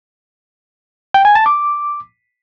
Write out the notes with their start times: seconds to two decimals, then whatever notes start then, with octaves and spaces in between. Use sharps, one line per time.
1.14 G5
1.25 G#5
1.35 A5
1.46 D6